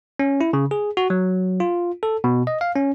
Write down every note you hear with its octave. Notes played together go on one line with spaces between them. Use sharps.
C#4
E4
C#3
G#4
F#4
F#3
F4
A4
B2
D#5
F5
C#4